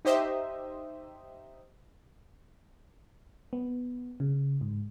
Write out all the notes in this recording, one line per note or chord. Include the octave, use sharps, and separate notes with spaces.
D#4 G4 C5 D#5 E5
B3
C#3
G#2